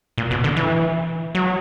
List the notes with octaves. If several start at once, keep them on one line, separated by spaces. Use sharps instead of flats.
A#2
B2
D3
E3
F#3